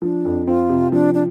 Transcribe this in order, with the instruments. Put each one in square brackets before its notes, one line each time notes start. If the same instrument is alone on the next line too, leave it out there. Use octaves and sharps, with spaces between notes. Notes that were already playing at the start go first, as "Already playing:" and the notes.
[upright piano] F3 [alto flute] D4
[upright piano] F2
[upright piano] C4 [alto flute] F4
[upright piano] C3
[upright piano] F3 [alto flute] D4
[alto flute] D4